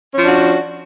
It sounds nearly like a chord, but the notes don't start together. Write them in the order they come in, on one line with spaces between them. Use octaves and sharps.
C#4 F3 D4 F#4